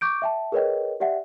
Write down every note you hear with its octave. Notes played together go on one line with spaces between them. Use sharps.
C#6 D6 G6 D7
E5 G5 A5
G#4 A#4 B4 C#5 D#5 G5
G4 D5 E5 F#5 G5